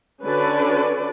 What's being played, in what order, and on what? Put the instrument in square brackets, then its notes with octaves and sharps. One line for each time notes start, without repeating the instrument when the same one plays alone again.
[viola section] D3 C#4 D4 F#4 B4 D5